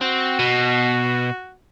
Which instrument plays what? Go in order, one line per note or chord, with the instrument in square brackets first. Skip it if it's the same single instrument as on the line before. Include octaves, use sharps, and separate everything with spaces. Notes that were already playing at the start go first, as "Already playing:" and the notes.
[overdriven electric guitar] C4 [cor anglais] F#4
[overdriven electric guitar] B2